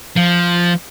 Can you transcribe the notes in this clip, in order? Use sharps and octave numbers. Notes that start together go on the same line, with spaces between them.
F3